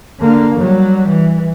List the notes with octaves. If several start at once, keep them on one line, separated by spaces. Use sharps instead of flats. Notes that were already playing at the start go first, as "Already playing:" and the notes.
D3 A#3
F#3 G3
E3